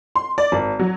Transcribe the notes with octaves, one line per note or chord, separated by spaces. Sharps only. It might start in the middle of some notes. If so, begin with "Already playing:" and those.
C6
D5
G#1
F#3